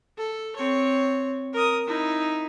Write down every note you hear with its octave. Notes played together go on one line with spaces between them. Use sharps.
A4
C4 C#5
A#4 D#6
D#4 E4